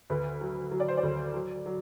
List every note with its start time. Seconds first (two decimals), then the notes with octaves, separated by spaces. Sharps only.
0.10 D2 B4
0.41 F#3
0.71 F#3
0.80 D5
0.88 C5
0.97 D5
1.03 D2
1.34 F#3
1.66 F#3